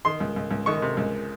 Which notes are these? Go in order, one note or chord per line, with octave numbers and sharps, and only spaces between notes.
D#3 C6
C#2
C#2
C#2
D#3 C#6
C3
C#2